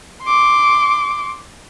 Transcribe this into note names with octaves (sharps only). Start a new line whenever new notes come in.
C6 D6